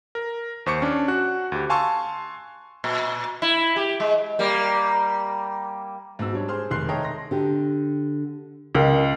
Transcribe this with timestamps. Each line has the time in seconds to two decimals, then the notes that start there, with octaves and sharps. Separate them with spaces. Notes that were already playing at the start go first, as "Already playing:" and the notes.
0.15 A#4
0.66 D#2 C5 C#6 D6 C#7
0.82 C#4 D4
1.08 F#4 F#6
1.52 D2 G4
1.70 F5 G#5 A5 C6 C#6 E6
2.84 A#2
3.42 E4
3.76 G4
4.00 G#3
4.39 G3 A#3
6.19 G#2 B2 E6
6.33 G3 D4 C#5
6.48 G#4 C5 C6 F6
6.71 F1 D#3 G#3 C6 F#6 C7
6.88 A4 C#5 D#5 E5 G5 A#5
7.03 C6 A#6
7.31 D3 G4
8.75 C#2 A#4 D#5